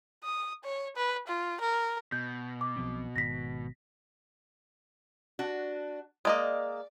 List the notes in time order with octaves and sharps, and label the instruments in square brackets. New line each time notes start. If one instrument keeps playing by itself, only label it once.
[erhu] D#6
C#5
B4
F4
A#4
[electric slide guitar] B2 [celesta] G6
[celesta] D6
[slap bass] B1 F3 C4
[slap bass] G#1 [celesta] A#6 B6
[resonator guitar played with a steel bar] D4 F#4
[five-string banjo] G#3 A#3 D#5 [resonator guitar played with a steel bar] D5